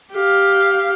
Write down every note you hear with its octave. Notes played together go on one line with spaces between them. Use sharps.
G4 F5